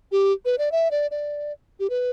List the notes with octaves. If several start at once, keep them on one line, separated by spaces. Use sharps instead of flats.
G4
B4
D5
E5
D5
D5
G4
B4